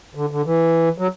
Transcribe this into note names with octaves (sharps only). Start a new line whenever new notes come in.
D3
D3
E3
F#3